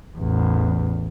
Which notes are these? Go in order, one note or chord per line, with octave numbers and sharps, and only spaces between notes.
A1 E2